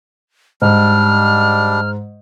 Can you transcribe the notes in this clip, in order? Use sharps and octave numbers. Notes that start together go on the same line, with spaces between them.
G#2 G3 D4 F6